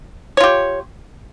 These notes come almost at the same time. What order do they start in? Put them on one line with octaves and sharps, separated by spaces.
C#5 F4 G4